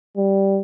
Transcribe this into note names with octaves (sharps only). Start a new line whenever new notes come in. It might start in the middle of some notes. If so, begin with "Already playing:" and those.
G3